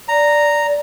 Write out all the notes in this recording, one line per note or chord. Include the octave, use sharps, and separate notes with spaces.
D5 A#5